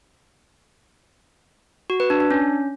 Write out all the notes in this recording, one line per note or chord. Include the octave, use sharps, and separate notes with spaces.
F#4
B4
D4
D4
C#4